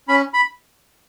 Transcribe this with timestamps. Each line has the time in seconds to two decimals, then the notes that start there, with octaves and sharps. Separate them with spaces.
0.08 C#4 B5
0.34 B5